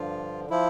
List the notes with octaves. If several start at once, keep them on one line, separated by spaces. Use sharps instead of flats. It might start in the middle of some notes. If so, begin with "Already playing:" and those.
Already playing: G2 D3 F3 F4
F3 E4